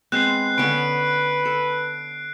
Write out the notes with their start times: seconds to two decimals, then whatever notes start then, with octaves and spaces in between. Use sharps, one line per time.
0.12 G#3 B3 C4 F#6 C7
0.58 D3 B3 C#4 B4 D7
1.45 A4